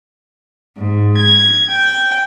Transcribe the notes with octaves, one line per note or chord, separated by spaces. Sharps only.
G#2
G#6
G5